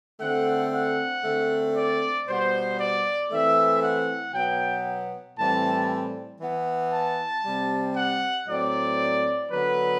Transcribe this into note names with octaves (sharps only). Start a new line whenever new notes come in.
D3 A3 C4 F#5
F#5
D3 A3 C4
D5
B2 G3 B3 C5
D5
E3 A3 C4 E5
F#5
B2 F#3 B3 G5
A2 E3 G3 C4 A5
E3 B3
A5
C3 G3 C4
F#5
A2 F#3 C4 D5
D3 F#3 B3 B4